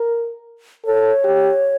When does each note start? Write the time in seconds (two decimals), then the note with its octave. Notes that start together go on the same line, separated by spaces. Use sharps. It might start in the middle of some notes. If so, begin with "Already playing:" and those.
Already playing: A#4
0.86 A4 C#5
1.24 G4